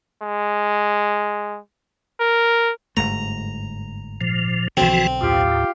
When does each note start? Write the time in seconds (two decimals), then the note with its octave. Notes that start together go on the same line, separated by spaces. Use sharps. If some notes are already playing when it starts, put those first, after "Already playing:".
0.22 G#3
2.20 A#4
2.97 G1 G#2 A3 A#5
4.21 A#2 F3
4.77 B1 D3 E3 F3 C4 F#4
5.21 D#2 A2 F4 G4